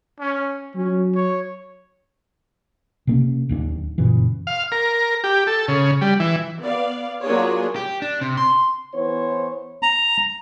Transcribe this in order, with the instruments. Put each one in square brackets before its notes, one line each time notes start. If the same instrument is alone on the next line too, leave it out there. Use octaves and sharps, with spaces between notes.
[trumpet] C#4
[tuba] F#3 [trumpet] C#4
[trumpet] C#5
[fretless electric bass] C3 A#3 C#4
D1 D#2 C4 D4
F#2 A#2 C#3 E3
[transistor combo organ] F5
A#4
G4
A4
C#3
G3
E3
[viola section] B3 D5 F5
F#3 A#3 D4 F4 G#4 C#5
[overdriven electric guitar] G4
D4
C3
C6
[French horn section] E3 B3 E4 C5 C#5
[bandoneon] A#5